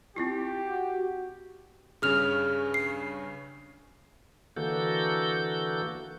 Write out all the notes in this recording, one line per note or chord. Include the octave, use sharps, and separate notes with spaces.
C4 E4 F4 G4
F#4
G2 C#3 C#4 G#4 F6 F7
C7
D3 E3 A#3 F#4 A4 G6